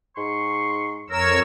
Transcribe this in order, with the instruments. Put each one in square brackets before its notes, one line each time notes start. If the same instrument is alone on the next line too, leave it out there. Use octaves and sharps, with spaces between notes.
[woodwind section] G#2 C6 C#6
[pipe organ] F2 C#5 E6 [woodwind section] A#4